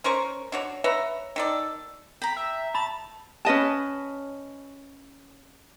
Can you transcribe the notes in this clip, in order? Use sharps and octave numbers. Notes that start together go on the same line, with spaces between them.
C#4 A#4 C5 C#6
D4 F#4 C#5
B4 C#5 E5 A#5
D#3 A4 D5
G5 A#5 B5
E5
A5 B5 A6
C#4 B4 D#5 A5